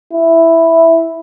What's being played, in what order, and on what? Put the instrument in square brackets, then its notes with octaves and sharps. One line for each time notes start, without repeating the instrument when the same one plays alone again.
[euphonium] E4